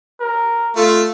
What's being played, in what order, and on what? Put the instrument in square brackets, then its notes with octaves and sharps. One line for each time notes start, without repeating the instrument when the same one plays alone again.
[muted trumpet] A#4
[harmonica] A3 [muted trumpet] F4